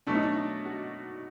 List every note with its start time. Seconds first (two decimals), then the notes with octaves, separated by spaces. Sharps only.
0.07 B2 F#3 A3 D4
0.15 D#4
0.23 D4
0.36 D#4
0.65 F#4